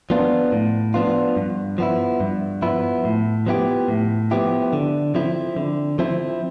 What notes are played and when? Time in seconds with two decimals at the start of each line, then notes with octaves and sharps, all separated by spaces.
0.10 F3 B3 D4 F4
0.52 A2
0.94 F3 B3 D4 F4
1.37 G2
1.78 F3 B3 E4
2.20 G2
2.62 F3 B3 E4
3.05 A2
3.46 F3 B3 E4 G4
3.88 A2
4.31 F3 B3 E4 G4
4.73 D3
5.15 F3 C4 E4
5.57 D3
5.99 F3 C4 E4